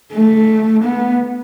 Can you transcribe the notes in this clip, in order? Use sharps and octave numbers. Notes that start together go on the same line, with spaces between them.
A3
B3